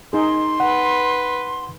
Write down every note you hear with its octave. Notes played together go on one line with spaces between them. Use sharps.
D#4 G#4 C6
B4 F#5